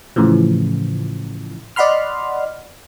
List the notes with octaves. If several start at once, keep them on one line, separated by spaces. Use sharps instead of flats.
A2 C#3 E3 F3
D5 D#5 F#5 B5 C6 F6